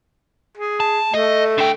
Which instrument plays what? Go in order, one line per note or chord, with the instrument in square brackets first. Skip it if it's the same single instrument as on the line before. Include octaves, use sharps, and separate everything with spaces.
[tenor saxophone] G#4
[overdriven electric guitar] A5
[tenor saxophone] A3 [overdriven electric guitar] D#5
[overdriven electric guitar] D3 G5